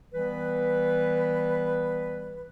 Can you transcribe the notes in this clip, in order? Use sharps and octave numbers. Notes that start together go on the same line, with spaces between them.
E3 G3 B3 B4